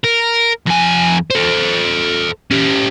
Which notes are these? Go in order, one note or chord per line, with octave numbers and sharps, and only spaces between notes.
A#4
F2 G#5
A4 C5
C#4 G4